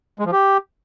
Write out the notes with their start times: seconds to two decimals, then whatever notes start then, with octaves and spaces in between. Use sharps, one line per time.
0.19 G#3
0.26 F3
0.32 G4